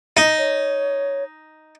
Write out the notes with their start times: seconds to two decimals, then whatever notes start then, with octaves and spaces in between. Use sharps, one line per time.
0.17 D#4
0.38 C#5